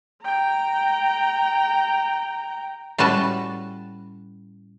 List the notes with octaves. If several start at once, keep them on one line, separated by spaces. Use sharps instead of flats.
G5 A#5
A2 G3 C#4 F#4 B4 A5